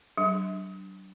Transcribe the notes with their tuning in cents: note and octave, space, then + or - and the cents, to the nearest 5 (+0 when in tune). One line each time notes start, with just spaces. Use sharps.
F#3 +45 D4 +0